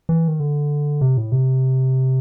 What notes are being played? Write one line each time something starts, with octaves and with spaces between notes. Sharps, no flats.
E3
D#3
D3
C3
A2
C3